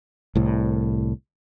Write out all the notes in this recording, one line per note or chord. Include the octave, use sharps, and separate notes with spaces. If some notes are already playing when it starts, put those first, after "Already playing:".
C2 A2